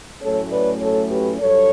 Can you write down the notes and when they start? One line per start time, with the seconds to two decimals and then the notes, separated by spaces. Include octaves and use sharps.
0.22 A2 F#3 A3 C#4 A4 C#5
0.51 B4 D5
0.81 A4 C#5
1.10 G4 B4
1.40 G2 F#3 A4 C#5